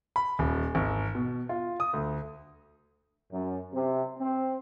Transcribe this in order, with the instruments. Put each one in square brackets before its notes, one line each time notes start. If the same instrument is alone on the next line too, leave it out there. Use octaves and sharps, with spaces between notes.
[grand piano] B5
D#1
G#1
B2
F4
D#6
D2
[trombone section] F#2
C3
C4